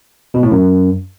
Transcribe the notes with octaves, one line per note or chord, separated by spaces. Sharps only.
B2
A2
F#2